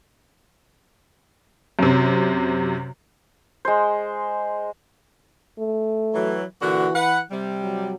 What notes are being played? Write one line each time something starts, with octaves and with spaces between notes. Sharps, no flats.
F#2 C3
G#3 C5
A3
E3 F#3
A#2 D3 E3 F#4
B4 F#5
C3 G3
F#3